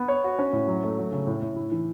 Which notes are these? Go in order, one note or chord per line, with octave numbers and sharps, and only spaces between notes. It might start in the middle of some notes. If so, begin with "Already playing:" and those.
Already playing: B3
C#5
F#4
C#4
A2
F#3
A3
F#3
C#3
A2
A2
E4
E3